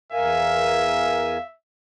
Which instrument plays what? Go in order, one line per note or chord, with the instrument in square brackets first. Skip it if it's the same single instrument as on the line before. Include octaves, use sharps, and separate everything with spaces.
[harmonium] E2 A#4 G#5 [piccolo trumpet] E5 [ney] F5